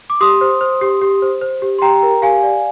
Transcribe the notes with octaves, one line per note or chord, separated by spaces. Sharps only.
D6
G4 C6 D#6
C5
C5
G4
G4
C5
C5
G4
C6
G4 G5 A#5
A#4
G4 F5 G#5
D5